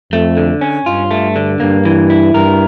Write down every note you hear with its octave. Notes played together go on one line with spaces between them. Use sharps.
F2 A3
D3
C#4
G2 F4
A3
D3
G2 A#3
E3
E4
G2 A#4